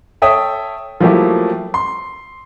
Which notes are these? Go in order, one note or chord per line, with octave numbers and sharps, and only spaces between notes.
A4 C#5 E5 G5 D#6
F3 F#3 A3 A#3 E4 G4
C6